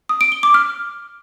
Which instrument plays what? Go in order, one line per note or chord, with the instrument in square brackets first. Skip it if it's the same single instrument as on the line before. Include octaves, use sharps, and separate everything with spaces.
[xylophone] D#6
D7
G7
D6
F6